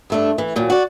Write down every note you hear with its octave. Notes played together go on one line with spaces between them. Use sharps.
G2 A3 D4
E3
D#2 A#2 F#3
F#4 D5